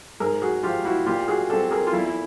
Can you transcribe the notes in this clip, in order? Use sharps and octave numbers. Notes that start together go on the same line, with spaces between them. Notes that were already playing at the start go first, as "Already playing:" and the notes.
G#2 G#4 A#4
F#4 G#4
F3 G#3 F4 G4
E4 F#4
A#2 F4 G4
F#4 G#4
G3 C4 G4 A4
G#4 A#4
F4
E2 E4
E4